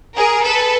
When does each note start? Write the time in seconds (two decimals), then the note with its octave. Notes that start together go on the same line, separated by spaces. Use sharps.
0.15 G#4 A#4
0.44 A4 B4